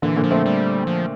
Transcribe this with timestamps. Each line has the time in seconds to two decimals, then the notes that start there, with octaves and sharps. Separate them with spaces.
0.02 A#2 D3 E3
0.16 A#2 D3
0.24 F3
0.31 A3 C4
0.46 G3
0.87 F3